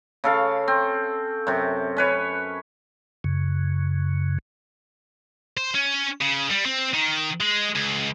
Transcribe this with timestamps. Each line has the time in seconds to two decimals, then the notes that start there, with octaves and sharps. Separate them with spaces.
0.24 C#3 A4 F5
0.68 C4
1.47 F#2 C3
1.97 C#4 B4 C#5
3.24 F#2 C#3
5.57 C5
5.75 C#4
6.21 C#3
6.51 G3
6.66 C4
6.94 D#3
7.40 G#3
7.76 C#2